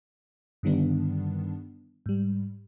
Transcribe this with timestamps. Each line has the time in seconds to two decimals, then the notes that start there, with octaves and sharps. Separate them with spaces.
0.63 G2 D3 D#3 G3 B3 D4
2.06 G#2 G3